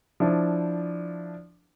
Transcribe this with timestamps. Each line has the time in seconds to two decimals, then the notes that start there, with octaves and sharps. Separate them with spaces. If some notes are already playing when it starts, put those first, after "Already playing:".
0.20 F3 D4 E4